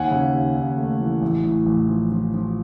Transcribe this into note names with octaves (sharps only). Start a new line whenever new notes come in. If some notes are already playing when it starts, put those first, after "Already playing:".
Already playing: D#2 F#5 G#5
C#3
D#2
D#2
A3
E3
A1
A2
A1
F3
F3
F3